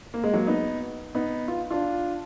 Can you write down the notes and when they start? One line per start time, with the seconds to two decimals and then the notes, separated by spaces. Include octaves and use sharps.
0.14 A#3
0.24 G#3
0.33 F#3 A#3
0.47 B3 D#4
1.15 B3 D#4
1.48 F4
1.71 D4 F4